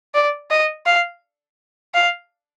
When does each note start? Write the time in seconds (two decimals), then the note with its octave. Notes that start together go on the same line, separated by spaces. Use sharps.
0.15 D5
0.51 D#5
0.86 F5
1.94 F5